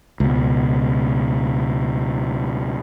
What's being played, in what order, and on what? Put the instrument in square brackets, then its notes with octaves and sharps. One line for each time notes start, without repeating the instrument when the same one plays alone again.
[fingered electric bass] C#2 B2